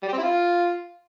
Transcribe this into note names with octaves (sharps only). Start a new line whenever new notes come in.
G3
G4
C4
E4
F4